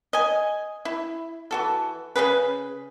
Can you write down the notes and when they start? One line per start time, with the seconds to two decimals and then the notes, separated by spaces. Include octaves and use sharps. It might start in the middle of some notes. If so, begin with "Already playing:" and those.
0.13 D#5 G#5
0.85 E4
1.51 E3 F#4 A4
2.16 C#3 B3 G#4 B4